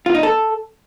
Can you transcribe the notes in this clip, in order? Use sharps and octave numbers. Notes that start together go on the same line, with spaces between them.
F4
D#4
A4